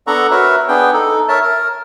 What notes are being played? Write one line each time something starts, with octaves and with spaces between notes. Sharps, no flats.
B3 D4 A4 F#5 A#5 C#6
F#4 A#4 B4 C#5 E5
B3 D4 G#4 B4 G5
D#4 A4
A#4 C#5 E5 A5
A#4